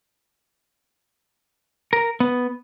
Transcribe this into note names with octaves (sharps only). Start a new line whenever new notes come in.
A#4
B3